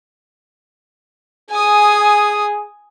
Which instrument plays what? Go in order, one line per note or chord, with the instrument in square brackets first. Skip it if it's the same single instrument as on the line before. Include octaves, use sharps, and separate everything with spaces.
[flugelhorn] G#4 [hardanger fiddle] G#5 D#6